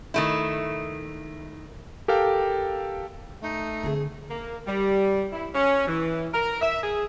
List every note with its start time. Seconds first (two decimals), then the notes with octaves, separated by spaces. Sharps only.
0.14 D#3 A3 E4
2.08 G4 A4 A#4 F5 G5
3.42 A3 D#4
3.83 D3 C4 G#4
4.29 A#3
4.66 G3
5.32 E4
5.54 C#4
5.87 E3
6.33 A#4
6.61 E5
6.82 G#4